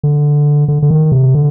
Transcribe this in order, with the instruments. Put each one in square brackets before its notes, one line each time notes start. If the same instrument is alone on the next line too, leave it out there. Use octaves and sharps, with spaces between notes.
[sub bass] D3
D3
D3
D#3
C3
D3